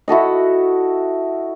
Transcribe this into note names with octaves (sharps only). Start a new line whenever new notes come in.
E4 F#4 A4 D#5